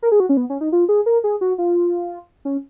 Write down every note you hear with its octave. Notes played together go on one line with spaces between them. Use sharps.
A#4
G#4
F#4
C#4
B3
C#4
D#4
F4
G#4
A#4
G#4
F#4
F4
C#4